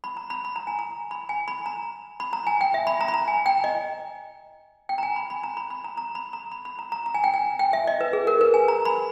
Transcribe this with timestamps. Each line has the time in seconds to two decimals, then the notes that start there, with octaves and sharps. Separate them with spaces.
0.04 B5
0.17 A#5
0.30 B5
0.45 B5
0.56 A#5
0.67 G#5
0.79 A#5
1.11 B5
1.29 G#5
1.48 B5
1.66 A#5
2.20 B5
2.33 A#5
2.47 G#5
2.61 G5
2.74 E5
2.87 B5
3.01 A#5
3.08 B5
3.14 A#5
3.28 G#5
3.46 G5
3.64 D#5
4.89 G5
4.98 A#5
5.03 G#5
5.16 B5
5.30 B5
5.43 A#5
5.57 B5
5.70 B5
5.84 A#5
5.97 A#5
6.15 B5
6.33 A#5
6.52 B5
6.65 B5
6.79 A#5
6.92 A#5
7.06 A#5
7.14 G#5
7.24 G5
7.34 G#5
7.59 G5
7.73 E5
7.87 D#5
8.01 B4
8.13 G#4
8.27 A#4
8.41 B4
8.54 G#5
8.68 A#5
8.85 B5